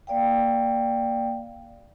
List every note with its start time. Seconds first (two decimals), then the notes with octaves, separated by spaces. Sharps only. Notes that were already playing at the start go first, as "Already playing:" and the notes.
0.07 A#3 D5 F5 G5